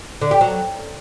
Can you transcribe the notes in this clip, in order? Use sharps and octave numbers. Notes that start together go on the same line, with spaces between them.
D3
G4
F#3